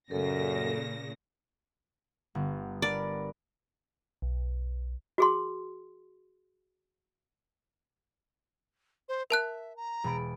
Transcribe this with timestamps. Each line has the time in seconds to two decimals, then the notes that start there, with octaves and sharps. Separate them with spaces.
0.11 F#2 A#2 C#3 A4 A#6
2.35 G1 B3
2.82 D4 A#4 D5 B5
4.22 B1
5.18 F#4 G#4 C6
9.09 C5
9.30 A#4 E5 A5 F#6
9.77 A#5
10.04 E1 B5 D7